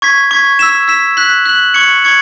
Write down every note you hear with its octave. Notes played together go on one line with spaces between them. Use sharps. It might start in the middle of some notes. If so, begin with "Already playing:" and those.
C#6 G#6 B6
C#6 G#6 B6
E6 B6 E7
E6 B6 E7
F#6 B6 F#7
F#6 B6 F#7
C#6 G#6 C#7 F#7
C#6 G#6 C#7 F#7